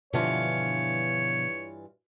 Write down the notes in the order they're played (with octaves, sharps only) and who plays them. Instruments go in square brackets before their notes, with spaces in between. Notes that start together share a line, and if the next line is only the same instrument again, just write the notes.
[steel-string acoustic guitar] G2 E3 F4 [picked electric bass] B2 D3 F3 [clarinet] C#5